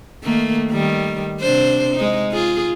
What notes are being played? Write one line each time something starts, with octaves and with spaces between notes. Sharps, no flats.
D#3 A3 A#3
D#3 G3
C3 D4 C5
G#3 D#4
F4 G#4